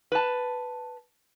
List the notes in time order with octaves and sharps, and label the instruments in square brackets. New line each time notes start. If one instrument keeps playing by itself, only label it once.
[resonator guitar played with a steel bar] B4 A5